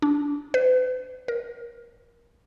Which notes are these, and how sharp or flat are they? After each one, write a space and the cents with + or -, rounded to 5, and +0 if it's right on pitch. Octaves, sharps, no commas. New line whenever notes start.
D4 -20
B4 +45
A#4 +20